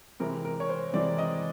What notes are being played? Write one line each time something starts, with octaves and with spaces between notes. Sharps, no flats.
C3 E3 G#3 C4 E4 A#4
A#4
C#5
C5
C3 E3 G#3 C4 E4 D5
D#5